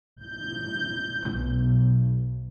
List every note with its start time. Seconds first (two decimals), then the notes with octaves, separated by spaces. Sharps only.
0.23 G6
1.31 B1